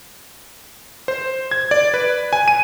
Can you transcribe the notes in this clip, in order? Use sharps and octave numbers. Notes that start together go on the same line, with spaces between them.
C5
G#6
D5
B4
G#5
D#7